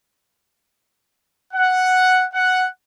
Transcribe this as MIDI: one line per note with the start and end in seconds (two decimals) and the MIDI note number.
1.54 2.24 78
2.33 2.64 78